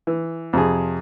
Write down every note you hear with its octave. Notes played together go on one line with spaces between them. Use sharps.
E3
F2 C3 G#4